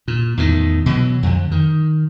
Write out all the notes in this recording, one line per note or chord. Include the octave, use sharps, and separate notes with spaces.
A#2
E2 A2 D#3
B2 E3 F#3
F2 D3
D#3